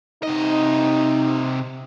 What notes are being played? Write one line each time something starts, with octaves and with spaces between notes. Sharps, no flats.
C3 D#4 D#5